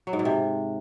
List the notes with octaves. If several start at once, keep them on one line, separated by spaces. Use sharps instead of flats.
F#3
G#2
B2
C3